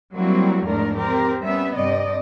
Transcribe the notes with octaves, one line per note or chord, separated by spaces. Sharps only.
F#3 G3 A#3 C4 E4 F#4
E2 G#2 F3 A3 D4 A#4
C4 G4 A#4
G3 B3 C#4 E5
G2 C3 D5 D#5